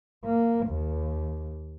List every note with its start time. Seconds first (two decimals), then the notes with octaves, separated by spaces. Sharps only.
0.25 A#3
0.67 D#2